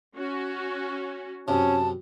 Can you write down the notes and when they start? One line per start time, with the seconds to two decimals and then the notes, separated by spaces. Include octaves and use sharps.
0.16 C#4 F#4
1.48 F#2 C3 C#4 A5